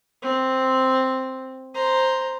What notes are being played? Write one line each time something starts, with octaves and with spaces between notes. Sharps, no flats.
C4
C5 A#5